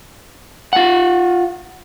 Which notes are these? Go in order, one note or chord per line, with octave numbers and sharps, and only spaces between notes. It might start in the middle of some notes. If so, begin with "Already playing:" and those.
F4 F#5